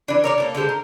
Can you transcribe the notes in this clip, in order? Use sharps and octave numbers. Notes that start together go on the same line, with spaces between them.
E3 D4
A#4 C#5 D5
A#3 B3 A4
D3 G#3 G4 C5
A#4